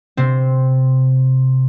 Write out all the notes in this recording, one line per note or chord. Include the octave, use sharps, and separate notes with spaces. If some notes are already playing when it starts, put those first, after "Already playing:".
C3 C4